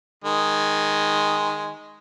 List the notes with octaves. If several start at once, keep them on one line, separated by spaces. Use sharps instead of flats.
D#3 G#3